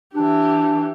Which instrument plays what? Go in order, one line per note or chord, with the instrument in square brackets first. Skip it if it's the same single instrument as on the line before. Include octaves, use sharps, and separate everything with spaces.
[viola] E3 G4 [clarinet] D4